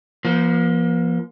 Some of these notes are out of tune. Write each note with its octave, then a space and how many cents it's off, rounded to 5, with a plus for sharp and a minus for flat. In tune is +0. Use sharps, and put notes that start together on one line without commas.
F3 -25 A#3 +35